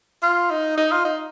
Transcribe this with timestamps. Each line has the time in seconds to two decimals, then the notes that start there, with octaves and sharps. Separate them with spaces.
0.23 F4
0.50 D#4
0.77 D#4
0.92 F4
1.05 D#4